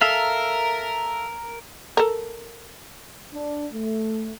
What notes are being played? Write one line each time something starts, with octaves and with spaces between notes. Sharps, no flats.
A4 A#4 E5 F5
A4 A#4
D4
A3